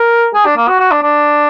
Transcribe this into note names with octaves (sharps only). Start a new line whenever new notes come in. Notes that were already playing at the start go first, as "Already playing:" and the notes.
Already playing: A#4
G#4
D4
A#3
F#4
F#4
D4
D4